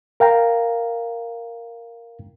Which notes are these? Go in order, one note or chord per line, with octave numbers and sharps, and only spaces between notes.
A#4 F5 G5 A#5